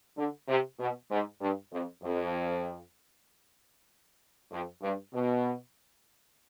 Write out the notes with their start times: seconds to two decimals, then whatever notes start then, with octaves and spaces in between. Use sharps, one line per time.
0.18 D3
0.48 C3
0.80 B2
1.11 G#2
1.41 G2
1.72 F2
2.03 F2
4.51 F2
4.82 G2
5.14 B2